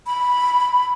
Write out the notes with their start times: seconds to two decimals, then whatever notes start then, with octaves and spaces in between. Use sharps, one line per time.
0.07 B5